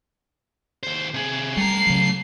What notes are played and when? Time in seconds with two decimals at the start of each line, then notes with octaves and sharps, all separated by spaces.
0.83 D#2 C5
1.14 C3 G#4
1.57 G3 A3 A#5 C7
1.87 C#3 F#3